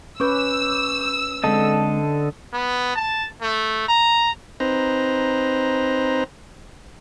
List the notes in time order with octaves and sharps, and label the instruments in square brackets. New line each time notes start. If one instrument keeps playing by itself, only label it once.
[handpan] C#4 B4 [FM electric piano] C#6 D6 G6 [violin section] E6
[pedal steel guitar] D3 A4 D#5 [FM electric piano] G#3 C4
[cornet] B3
A5
A3
A#5
[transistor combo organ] C4 D#4 B4 C5 A#5